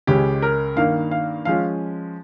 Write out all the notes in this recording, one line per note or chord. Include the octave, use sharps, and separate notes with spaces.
C#2 C#3 G#3 C#4 G4
A#4
G2 D#3 A#3 F5
F5
F3 G#3 C#4 F5